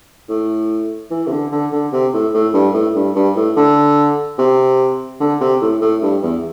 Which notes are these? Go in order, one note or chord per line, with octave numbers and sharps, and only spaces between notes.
A2
E3
C3
D3
D3
D3
C3
A2
A2
G2
A2
G2
G2
A2
D3
C3
D3
C3
A2
A2
G2
E2